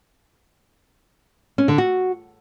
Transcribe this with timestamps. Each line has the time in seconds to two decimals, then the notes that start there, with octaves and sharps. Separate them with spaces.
1.58 C#4
1.68 D3
1.78 F#4